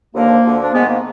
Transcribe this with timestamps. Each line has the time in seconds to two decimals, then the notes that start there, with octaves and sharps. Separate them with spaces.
0.15 D#2 D3 F3 A#3
0.44 D2 D3 F3
0.62 D4
0.73 G#2 D#3 G#3 B3
0.88 A#3